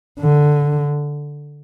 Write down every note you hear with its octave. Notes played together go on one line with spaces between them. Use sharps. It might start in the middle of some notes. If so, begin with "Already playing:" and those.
D3